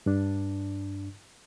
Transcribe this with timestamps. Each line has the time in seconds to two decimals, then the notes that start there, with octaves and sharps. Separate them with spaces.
0.06 G2 D4